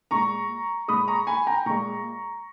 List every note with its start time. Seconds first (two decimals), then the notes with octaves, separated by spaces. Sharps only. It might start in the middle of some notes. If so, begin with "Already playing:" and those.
0.11 A#2 G#3 A#5 C#6
0.88 A#2 G#3 B5 D#6
1.08 A#5 C#6
1.27 G#5 B5
1.47 G5 A#5
1.66 A#2 G#3 A#5 C#6